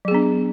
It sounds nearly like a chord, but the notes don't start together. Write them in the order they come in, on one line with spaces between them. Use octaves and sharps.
F#3 G#4 B3 D4